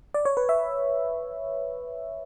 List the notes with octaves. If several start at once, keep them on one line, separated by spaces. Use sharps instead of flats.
D5
C#5
B4
E5